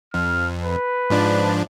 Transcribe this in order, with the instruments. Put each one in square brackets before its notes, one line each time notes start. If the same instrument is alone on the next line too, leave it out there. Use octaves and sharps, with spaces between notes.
[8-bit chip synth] F2 [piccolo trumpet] F6
[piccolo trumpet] B4
[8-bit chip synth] G#2 F3 D4